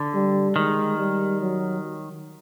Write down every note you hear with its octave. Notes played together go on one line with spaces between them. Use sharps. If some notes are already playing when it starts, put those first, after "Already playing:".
Already playing: D3
G3
D#3 G#3
G3
F#3